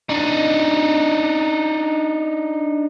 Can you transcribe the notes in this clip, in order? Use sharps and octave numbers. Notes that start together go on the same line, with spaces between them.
D4 D#4